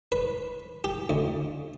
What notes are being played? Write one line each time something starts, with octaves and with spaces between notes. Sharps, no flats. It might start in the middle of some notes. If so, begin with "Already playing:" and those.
B4
G4
D2